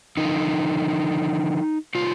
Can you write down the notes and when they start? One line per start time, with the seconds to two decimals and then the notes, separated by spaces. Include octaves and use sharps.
0.17 D3 F3 D#4
1.95 C3 D#3 G3 F4